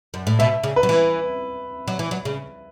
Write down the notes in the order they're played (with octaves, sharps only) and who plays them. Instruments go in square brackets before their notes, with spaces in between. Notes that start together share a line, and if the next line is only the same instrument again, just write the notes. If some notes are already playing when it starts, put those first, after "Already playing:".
[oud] F#2
A2
[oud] B2 [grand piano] E5
[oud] C#3
[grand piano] B4
[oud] F#3
E3
F#3
E3
F#3
C#3